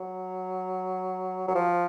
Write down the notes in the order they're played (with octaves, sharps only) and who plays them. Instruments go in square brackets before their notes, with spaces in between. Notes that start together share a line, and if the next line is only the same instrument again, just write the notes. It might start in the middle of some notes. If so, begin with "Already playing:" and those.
Already playing: [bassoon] F#3
F#3
F3